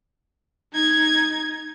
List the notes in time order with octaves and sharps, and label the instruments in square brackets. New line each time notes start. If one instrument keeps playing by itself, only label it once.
[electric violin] D#4 G#6